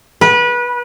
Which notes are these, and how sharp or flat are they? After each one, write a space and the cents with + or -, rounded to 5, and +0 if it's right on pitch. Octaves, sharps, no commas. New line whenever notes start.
B4 -25